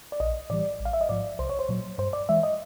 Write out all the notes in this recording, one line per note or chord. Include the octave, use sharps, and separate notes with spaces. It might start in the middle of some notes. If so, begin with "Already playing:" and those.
D5
A#1 D#5
A2 E3 G3 D5
A1
F5
E5
D#5
G#2 F3 D5
C2 C5
C#5
C5
A#2 F#3
G2 C5
D5
E3 G#3 E5
D#5